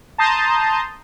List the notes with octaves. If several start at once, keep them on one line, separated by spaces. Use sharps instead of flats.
A5 A#5 C6 D#6 G6